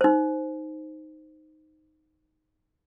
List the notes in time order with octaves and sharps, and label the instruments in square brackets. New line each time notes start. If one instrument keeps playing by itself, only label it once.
[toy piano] D#4 C5